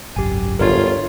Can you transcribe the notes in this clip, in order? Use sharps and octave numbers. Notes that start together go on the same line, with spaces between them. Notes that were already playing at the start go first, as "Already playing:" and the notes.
G#1 C#2 F#2 G4 G#5
G1 F4 A#4 C#5